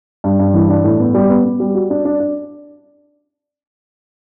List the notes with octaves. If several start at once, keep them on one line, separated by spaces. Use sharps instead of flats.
G2
G2
E3
D4
A2
B3
G3
B3
B3
G3
F#4
D4
D4
D4